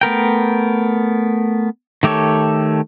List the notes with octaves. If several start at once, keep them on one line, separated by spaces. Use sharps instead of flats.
A3 B3 A#4 G5
D#3 A3 G4 A4 C#5